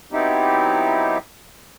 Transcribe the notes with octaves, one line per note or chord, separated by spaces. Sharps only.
F#3 B3 C4 D#4 E4 G4